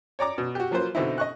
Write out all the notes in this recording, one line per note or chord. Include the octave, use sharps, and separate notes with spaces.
C#5 D5 A#5 D6
B2
F#4 G4
F3 F#3 A#3 F4 B4 C5
B2 D3 C4 D#4 E4
D#5 C#6 F#6